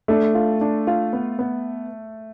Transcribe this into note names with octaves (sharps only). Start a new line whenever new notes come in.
A3 D4 A4
F4
D4
F4
B3
B3